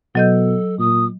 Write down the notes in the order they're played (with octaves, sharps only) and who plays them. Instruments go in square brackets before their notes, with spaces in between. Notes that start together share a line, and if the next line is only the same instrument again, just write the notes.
[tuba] B2 [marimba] F#3 D#5 G6 [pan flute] A4
[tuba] A#2 [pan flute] D#6